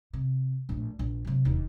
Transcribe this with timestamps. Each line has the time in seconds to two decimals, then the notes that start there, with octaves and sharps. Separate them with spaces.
0.13 C3
0.69 A#1 A2
0.99 A#1
1.25 C3 F#3
1.45 E1 D#2